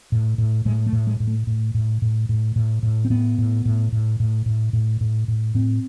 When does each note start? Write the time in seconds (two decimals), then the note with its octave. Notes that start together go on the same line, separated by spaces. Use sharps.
0.12 A2
0.38 A2
0.65 A2 G#3
0.86 A3
0.93 A2
1.07 G#3
1.20 A2
1.27 A3
1.47 A2
1.74 A2
2.02 A2
2.29 A2
2.56 A2
2.83 A2
3.05 C4
3.10 A2 B3
3.38 A2
3.65 A2
3.92 A2
4.20 A2
4.46 A2
4.73 A2
5.01 A2
5.28 A2
5.55 A2 C4